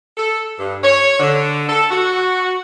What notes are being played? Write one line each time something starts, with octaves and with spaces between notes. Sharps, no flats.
A4
G2
C#5
D3
A4
F#4